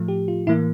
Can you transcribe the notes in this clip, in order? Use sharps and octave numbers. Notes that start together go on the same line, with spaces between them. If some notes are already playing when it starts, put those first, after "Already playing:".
Already playing: A2 F3 A3
G4
F4
A2 E3 A#3 E4